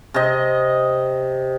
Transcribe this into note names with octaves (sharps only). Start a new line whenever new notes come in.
C3 D#5